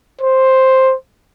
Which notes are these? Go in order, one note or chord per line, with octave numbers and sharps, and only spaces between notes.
C5